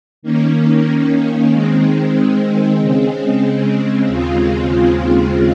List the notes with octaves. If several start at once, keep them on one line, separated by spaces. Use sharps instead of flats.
D#3 A#3 C#4
D#3 G#3 C4
C#3 G#3 C4
D#2 C#3 G#3 C4 F4